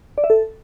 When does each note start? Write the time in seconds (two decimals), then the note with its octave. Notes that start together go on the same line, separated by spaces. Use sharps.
0.18 D5
0.24 E5
0.30 A4